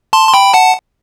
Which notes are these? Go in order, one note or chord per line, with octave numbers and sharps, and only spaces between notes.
A5 C6
C6
G5 B5
F#5 A5